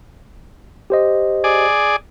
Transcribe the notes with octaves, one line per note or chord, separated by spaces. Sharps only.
G4 C5 D#5
G#4 D5